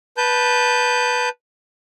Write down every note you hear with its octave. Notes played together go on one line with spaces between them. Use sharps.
B4 A5 G6